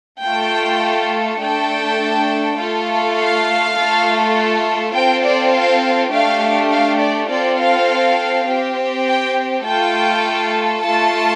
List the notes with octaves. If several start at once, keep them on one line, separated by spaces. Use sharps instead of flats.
A3 F4 A4 G5
A3 D4 A4 G5
A3 F4 A4
F5
A3 F4 A4
C4 F4 A4 G5
D5
F5
A3 D4 G4 F5
F5
D5
C4 F4 A4 D5
F5
C4 G4
G5
A3 F4 A4 G5
A3 F4 A4 A5